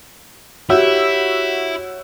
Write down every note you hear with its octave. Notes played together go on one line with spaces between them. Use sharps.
E4 F#4 G4 C#5 E6